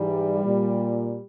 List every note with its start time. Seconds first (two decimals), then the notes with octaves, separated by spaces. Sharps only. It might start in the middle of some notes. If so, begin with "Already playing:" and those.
Already playing: G#2 E3 G3
0.44 A#2